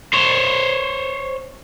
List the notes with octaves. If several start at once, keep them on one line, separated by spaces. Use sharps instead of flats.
C5 C#5